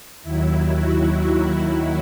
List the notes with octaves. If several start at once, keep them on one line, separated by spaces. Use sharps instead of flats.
D#2 D#3 F#3 E4
F#4